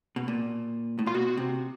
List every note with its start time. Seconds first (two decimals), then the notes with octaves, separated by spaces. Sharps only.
0.16 B2
0.28 A#2
0.99 A2
1.06 A#2 F4
1.14 B2 F#4
1.37 C3